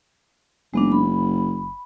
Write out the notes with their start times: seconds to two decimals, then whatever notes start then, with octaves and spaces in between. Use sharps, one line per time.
0.74 F#1 G#3 B3 D4
0.92 B5